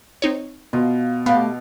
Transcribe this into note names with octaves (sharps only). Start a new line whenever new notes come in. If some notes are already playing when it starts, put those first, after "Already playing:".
C4 D#4 C#5
B2 F4
A3 B3 G4 F5